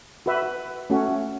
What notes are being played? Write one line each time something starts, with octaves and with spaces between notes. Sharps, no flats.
F#4 B4 E5
A3 C#4 F#4